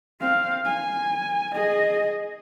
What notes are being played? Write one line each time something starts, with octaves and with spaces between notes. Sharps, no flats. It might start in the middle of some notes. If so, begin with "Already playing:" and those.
C4 F5
G#5
G#4 D#5